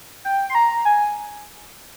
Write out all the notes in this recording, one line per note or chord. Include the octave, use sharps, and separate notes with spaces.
G5
C6
A#5
G#5